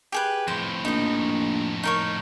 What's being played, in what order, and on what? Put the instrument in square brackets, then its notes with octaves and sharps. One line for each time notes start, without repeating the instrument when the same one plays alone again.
[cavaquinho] G4 G#4 B4
[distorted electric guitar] F2 A2 [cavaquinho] C5
[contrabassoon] A#1 [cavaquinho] D#4 D#5
[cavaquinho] D#4 A#4 C#5